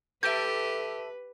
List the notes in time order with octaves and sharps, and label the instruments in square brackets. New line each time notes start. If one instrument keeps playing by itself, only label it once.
[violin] G4 [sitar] A4 E5 [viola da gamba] B4 [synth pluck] G6 D7